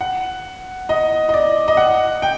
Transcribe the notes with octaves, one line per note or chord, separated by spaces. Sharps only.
F#5
D#5
D#5
D5
D#5
F#5
G5